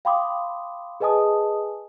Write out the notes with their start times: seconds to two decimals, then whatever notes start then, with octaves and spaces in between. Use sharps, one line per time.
0.05 F5 G5 B5 C6 D6 D#6
1.00 G#4 B4 D#5 G#5 A5 D#6